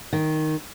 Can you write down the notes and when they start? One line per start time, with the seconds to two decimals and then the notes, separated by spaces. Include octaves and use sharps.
0.13 D#3